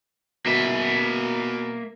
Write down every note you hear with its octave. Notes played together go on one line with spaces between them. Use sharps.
B2 A#3 E5